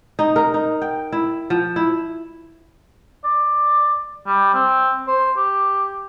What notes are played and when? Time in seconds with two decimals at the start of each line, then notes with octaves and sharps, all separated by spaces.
0.19 D#4
0.36 A#4
0.54 D#4
0.82 G5
1.12 E4
1.50 F3
1.76 E4
3.24 D5
4.26 G3
4.54 C4
5.08 C5
5.37 G4